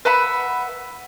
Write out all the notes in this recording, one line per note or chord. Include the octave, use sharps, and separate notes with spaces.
B4 E5 F#5 B5